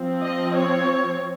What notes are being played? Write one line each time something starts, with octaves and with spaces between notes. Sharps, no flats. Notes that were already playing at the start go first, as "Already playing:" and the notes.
Already playing: F3 C4
D#5
C#5